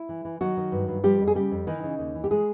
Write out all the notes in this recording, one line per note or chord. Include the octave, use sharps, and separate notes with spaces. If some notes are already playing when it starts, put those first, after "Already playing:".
Already playing: E4
E3
E3
D#3 F#3 F#4
D#3
G2
G2
F3 G3 G4
F2
G#4
C#3 G3 G4
F2
D#3 E3 D#4
C#3
D#2
E3
G4
G#3 G#4